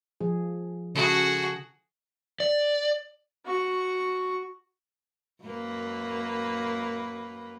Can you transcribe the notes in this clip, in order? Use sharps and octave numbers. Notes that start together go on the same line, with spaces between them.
F3 G#4
C#3 F#4 G#4 A4
D5
F#4 C#6
F#2 A#3 B4